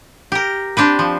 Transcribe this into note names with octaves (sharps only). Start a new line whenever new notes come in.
G4 A#4
C4 D4 G4 B4
F3